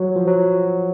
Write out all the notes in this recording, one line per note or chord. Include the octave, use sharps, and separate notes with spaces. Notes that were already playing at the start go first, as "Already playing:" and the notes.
Already playing: F#3
F3
F#3